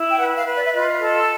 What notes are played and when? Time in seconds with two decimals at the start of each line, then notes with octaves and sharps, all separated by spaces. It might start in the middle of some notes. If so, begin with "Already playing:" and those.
Already playing: E4
0.10 G5
0.19 B4 F#5
0.36 F5
0.46 B4
0.55 D5
0.64 E5
0.72 F4 D#5
0.99 A4